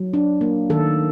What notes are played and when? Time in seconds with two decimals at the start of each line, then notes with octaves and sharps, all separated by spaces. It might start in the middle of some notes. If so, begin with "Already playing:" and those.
Already playing: F#3
0.13 D4
0.41 A#3
0.70 D#3 A4